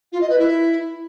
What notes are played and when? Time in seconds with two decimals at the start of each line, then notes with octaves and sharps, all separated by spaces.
0.12 F4
0.21 D#5
0.29 B4
0.38 E4